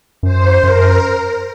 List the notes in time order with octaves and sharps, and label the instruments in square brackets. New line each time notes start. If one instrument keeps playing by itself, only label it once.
[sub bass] F#2 [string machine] C5
[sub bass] F#2 [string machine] A#4